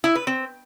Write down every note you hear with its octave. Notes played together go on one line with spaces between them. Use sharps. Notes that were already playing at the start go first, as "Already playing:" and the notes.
E4
B4
C4